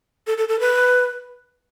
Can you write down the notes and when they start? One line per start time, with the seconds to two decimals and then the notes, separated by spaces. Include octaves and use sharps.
0.27 A4
0.38 A4
0.49 A4
0.60 B4